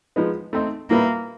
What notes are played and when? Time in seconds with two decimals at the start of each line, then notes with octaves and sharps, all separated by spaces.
0.16 F3 G#3 B3 D#4
0.53 A3 C4 D#4
0.90 A#2 G3 A#3 B3 E4